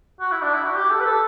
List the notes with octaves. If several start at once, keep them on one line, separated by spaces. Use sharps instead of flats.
F#4
E4
D4
E4
F#4
G4
A4
B4
A4